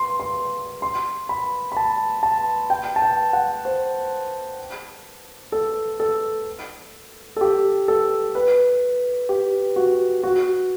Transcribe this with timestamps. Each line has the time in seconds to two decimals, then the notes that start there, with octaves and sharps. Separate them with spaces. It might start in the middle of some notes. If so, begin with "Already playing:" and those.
Already playing: C6
0.20 C6
0.82 C6
1.29 B5
1.72 B5
1.77 A5
2.23 A5
2.70 G5
2.96 A5
3.02 G5
3.33 F#5
3.65 C5
5.52 A4
6.00 A4
7.36 A4
7.41 G4
7.88 A4
8.35 B4
9.29 G4
9.76 F#4
10.23 F#4